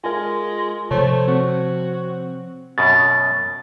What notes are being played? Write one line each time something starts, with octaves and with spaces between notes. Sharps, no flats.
G#3 F4 A#4 G#5
C3 F3 A3 C5 C#5
C4 F#4
F#2 B2 A6